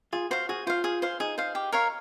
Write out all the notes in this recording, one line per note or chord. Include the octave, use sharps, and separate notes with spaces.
F4 G#4
F#4 C5 F5
F#4 G#4
F4 C5 F5
G#4
C5 F5
D#4 G#4
C5 F5
G4
A#4 C#5 F5